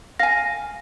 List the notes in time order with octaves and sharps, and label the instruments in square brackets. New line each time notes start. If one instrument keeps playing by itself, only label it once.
[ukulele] F5 G#5 [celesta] A#6